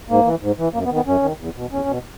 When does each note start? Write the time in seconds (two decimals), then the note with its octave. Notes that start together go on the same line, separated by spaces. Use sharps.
0.10 G#2 A#3
0.25 E3
0.42 G#2
0.59 E3
0.74 F#2 A#3
0.85 B3
0.91 D#3
0.96 B3
1.07 F#2 C#4
1.23 D#3
1.40 E2
1.56 B2
1.72 E2 C#4
1.89 B2